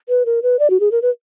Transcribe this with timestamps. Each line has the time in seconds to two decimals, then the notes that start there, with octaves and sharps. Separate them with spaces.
0.09 B4
0.26 A#4
0.43 B4
0.59 D5
0.70 F#4
0.80 G#4
0.91 A#4
1.02 B4